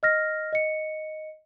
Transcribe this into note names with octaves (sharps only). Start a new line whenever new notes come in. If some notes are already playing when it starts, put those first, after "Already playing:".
D#5 F6 A#6
D#5 C#7